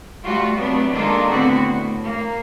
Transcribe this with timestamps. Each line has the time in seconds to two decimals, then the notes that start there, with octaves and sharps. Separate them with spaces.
0.24 G3 A3 F4 F#4
0.56 C3 F#3 A3 B3 D4
0.93 D#3 G#3 A#3 D4 F4 A4
1.30 A2 D3 B3 C4 F#4
1.66 A2
2.04 A#3